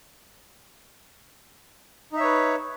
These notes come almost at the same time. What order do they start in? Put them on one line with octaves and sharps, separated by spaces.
D#4 E5 C#5 B4